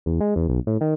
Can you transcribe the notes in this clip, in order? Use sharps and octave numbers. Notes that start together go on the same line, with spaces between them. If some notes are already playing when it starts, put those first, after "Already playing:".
E2
G#3
E2
B1
A2
D#3